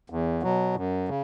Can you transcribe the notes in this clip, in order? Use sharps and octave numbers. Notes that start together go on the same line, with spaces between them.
E2
B2 F#3
F#2
C#3